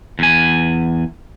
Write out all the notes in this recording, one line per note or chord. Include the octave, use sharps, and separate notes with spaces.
E2 G#5